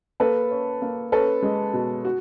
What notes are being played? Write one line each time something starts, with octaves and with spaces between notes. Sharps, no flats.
A#3 A4 B4
C#4
A#3
C#4 A4 B4
G#3
B2
F#4